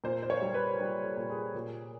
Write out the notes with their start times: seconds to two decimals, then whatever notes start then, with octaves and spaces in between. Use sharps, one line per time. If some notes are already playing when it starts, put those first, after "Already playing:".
0.04 A#2 C5
0.23 C5
0.30 C#5
0.42 G3
0.54 B4
0.80 G3
1.04 A4
1.17 A#2
1.29 G#4
1.54 A#2